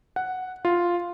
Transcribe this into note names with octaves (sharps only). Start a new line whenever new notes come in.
F#5
F4